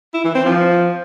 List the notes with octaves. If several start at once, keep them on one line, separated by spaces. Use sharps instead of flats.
E4
E3
C4
F3